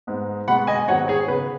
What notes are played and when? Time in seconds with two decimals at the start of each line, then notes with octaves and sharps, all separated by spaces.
0.07 G#2 G#3 B3
0.48 B2 G#3 B3 F#5 B5
0.67 D#5 G#5
0.88 G#2 D#3 F#3 B3 C#5 F#5
1.08 G#4 C#5
1.28 C#3 B3 B4